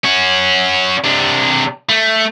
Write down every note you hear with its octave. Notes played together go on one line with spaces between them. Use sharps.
C#4 F#4
C3 D4
A3